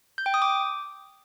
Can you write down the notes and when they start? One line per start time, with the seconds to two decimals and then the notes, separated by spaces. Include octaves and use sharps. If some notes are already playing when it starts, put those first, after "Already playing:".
0.18 G6
0.26 G5
0.34 D#6
0.42 D6